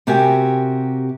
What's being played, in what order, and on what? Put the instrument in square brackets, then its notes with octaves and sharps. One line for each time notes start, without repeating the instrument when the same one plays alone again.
[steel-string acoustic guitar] C3 F#4 G4 A#4 E5 G#5